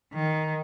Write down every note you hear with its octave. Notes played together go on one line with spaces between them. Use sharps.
D#3